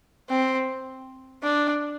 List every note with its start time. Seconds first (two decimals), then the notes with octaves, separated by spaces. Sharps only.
0.30 C4
1.43 D4